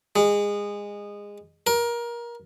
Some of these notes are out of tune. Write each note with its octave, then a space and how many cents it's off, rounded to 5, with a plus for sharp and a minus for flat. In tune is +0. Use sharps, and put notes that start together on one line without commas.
G#3 -20
A#4 +25